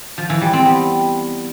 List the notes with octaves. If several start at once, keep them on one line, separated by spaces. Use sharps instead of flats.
F3
E3
G3
C4
B3